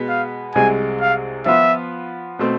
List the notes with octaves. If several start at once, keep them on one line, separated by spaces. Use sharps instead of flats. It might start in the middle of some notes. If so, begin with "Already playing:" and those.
Already playing: B2 G#3 B3
F5
C2 C3 G#3 G#5
F5
F3 B3 F4 E5
B2 A3 C4